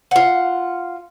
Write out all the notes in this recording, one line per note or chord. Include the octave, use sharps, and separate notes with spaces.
F4 F#5